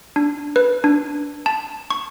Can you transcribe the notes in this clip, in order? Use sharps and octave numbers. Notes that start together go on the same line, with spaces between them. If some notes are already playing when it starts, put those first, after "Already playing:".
D4
B4
D4
A5
C#6